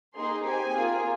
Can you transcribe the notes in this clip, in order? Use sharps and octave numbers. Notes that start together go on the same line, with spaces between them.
A#3 D#4 G#4 C6
C4 G4 G#5
A#3 F4 G#4